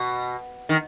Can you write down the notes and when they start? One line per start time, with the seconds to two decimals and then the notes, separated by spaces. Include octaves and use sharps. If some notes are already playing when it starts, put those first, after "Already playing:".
Already playing: B2
0.69 D#3